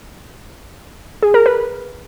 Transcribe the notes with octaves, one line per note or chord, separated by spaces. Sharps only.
G#4
A#4
B4